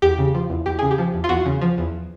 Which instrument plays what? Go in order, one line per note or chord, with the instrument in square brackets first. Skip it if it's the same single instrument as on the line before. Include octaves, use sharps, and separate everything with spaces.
[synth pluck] E2 G4
C#3
F3
E2
E2 G4
C#3 G#4
G4
F3
E2
F4
E2 F#4
C#3
F3
E2